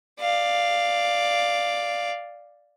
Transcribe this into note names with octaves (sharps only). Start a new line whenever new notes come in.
D5 F5